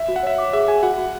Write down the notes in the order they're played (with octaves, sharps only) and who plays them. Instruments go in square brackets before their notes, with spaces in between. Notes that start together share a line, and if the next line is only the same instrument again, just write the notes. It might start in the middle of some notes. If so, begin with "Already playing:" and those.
Already playing: [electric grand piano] E5
[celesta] F#4
[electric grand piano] F#5
[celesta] C#5 [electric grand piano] E5
[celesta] D6
[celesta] G#4 [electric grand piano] E5
[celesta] G#4 [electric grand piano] G#5
[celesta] F#4 [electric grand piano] F#5
[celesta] F#4